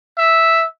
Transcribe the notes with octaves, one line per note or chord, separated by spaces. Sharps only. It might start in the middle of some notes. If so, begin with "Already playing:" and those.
E5